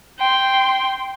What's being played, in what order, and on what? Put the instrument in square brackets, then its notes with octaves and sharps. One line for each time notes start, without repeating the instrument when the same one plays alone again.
[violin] G5 C6